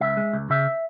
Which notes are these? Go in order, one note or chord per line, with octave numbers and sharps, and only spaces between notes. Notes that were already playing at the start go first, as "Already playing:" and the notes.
C#2 E5
G#3
C#2
C#3 E5